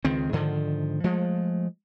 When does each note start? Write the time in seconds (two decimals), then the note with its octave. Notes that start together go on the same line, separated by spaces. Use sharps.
0.05 C#2 D#3 C4
0.32 G#2 D3 D#3 F3
1.04 F3 G#3 A3